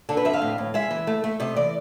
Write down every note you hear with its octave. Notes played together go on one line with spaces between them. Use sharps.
D3 A4
B4
F2 E5
F5
A2
A2
G#3 E5
E3
A3
A3
C3 D#5
E3 D5